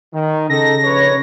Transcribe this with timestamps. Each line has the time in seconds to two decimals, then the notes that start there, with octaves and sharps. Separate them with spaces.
0.14 D#3
0.50 C#3 D#4 A4 A#6
0.85 A#1 B4 C#5